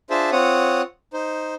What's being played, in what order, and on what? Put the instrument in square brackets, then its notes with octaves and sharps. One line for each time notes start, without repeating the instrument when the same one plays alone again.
[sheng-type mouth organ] D4 F4 G#4 C5 E5 A5
C4 F4 C#5 F#5 D#6
D#4 C5